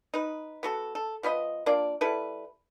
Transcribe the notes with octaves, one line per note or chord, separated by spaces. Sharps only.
D#4 B4
B3 F#4 A4
A4
F3 B3 B4 D#5
A#3 D4 F4 D5
G3 E4 A4 B4